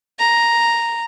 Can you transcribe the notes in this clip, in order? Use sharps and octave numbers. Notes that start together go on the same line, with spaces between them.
A#5